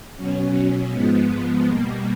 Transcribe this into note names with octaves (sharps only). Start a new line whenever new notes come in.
B2 F#3 C#4
G#2 F3 G#3 B3
B2 G3 A#3